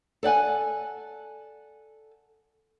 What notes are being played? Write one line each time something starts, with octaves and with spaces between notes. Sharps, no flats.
A4 D5 F#5 G#5